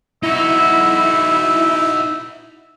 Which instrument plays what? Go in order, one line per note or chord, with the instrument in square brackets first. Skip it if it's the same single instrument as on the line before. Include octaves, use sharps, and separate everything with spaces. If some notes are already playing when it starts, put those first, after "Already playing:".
[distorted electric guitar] D#4 F#4 [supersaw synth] E4 [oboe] E5